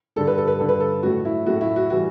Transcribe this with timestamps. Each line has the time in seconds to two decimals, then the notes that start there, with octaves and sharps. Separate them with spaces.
0.16 G2 D3 G3 A4
0.27 B4
0.38 A4
0.48 B4
0.59 G2 D3 G3 A4
0.69 B4
0.80 A4
1.03 A2 F#3 A3 F#4
1.25 E4
1.46 A2 F#3 A3 F#4
1.61 E4
1.76 F#4
1.90 E3 G3 F#4